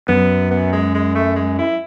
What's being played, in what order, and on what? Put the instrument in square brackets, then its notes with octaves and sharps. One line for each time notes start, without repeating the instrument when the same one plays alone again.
[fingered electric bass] F#2 [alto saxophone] B3
[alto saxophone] B3
G#3
G#3
A3
G#3
E4